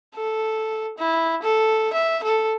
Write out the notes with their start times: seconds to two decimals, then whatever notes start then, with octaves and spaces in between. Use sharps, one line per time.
0.15 A4
0.98 E4
1.43 A4
1.93 E5
2.24 A4